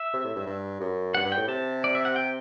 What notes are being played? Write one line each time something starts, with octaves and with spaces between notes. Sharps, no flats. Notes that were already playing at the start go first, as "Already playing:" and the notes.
Already playing: E5
C3
A2
G2
G2
F#2
G2 F#5
G2
A2 G5
C3 A5
D5
E5
F#5
G5